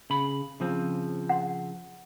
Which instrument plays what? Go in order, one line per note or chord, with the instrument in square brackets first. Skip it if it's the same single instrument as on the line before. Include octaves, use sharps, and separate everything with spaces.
[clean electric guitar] C#3 B5
C#3 F3 C4
[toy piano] F#5 C6